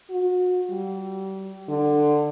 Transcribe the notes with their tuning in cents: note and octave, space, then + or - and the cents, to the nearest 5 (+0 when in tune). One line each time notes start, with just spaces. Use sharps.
F#4 -30
G3 -35
D3 +15